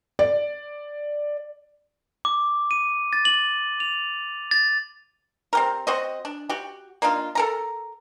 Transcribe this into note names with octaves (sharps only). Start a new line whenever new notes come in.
D5
D6
D#7
A6
F#7
F7
A6
C4 G4 A#4
C4 F#4 C5 D#5
D4
F#4 G4
A#3 D4 D#4 F4
A4 A#4 A#5